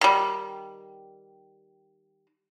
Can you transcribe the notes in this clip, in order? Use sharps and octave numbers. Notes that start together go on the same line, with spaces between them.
D#3 G3